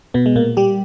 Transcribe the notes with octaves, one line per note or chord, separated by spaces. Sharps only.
B2 B3
G#3
A#2 A#3
G3 G4